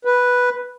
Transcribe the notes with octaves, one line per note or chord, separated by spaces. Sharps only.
B4